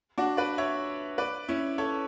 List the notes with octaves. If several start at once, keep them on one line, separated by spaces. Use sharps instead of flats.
D4 F#4
B4 D5
C#5 E5
B4 D5
C#4 E4
A4 C#5